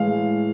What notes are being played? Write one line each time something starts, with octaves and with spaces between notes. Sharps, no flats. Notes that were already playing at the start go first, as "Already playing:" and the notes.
Already playing: A2 E3 G#3 F5